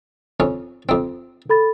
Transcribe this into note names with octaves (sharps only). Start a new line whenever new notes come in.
F2 C#4
F2 C4
A4 B5 A6